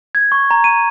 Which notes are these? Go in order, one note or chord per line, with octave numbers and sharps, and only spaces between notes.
G#6
C#6
A#5
D#7